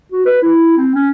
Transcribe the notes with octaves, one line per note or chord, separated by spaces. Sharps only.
F#4
B4
E4
C4
C#4